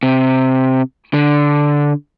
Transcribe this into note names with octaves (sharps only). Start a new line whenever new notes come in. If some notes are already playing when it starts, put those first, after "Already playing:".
C3
D3